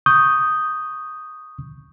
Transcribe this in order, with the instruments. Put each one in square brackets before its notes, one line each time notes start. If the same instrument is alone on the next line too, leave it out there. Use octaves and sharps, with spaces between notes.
[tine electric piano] C#6 D#6 G6